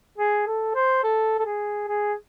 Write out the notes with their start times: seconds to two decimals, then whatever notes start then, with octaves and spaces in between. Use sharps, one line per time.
0.18 G#4
0.47 A4
0.75 C5
1.03 A4
1.39 A4
1.45 G#4
1.88 G#4